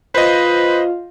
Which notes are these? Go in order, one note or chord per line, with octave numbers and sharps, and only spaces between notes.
F4 B4 C5 D#5